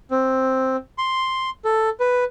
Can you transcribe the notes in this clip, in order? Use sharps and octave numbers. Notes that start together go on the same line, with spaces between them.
C4
C6
A4
B4